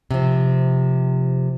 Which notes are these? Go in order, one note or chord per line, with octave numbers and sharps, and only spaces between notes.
C3 F3